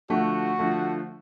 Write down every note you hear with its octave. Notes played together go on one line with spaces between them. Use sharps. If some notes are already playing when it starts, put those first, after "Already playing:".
D3 F3 A3 F#4
D3 F3 A3